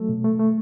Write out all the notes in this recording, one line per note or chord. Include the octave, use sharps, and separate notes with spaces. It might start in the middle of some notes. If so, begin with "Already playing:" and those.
Already playing: F#3 A3 A4
B2
A3
A3